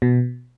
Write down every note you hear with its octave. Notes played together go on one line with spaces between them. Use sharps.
B2